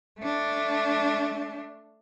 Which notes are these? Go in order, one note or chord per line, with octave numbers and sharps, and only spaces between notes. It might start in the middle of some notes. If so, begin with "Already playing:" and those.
A3 D4